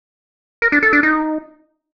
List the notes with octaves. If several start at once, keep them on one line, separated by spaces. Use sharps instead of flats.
A#4
D4
A4
D4
D#4